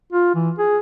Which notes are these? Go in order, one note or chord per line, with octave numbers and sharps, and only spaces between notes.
F4
E3
G#4